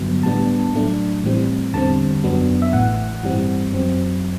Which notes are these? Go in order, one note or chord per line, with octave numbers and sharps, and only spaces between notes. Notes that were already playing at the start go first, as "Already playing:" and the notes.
Already playing: G1 G2 D3 F#3 B3
A2 G3 B3 D4 A5
A2 F#3 A3 D4
A2 E3 G3 C4
E2 D3 G3 C4 A5
F#2 F#3 B3 D4
E5
A1 A2 E3 F#5
G2 E3 G3 C4
F#2 F#3 C4